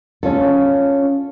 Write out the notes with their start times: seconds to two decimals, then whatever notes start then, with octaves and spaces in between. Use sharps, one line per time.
0.23 C#4 F4 A4